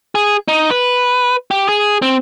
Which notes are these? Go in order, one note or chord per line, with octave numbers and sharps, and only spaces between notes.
G#4
D#4
B4
G4
G#4
C4